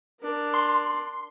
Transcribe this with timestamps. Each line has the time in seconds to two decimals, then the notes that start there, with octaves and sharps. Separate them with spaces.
0.21 D4 A#4
0.54 C6